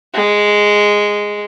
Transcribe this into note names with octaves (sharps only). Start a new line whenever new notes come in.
G#3